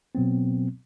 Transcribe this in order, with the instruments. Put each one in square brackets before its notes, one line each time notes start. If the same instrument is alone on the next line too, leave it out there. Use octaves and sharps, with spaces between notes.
[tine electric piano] B2 F#3 B3 C4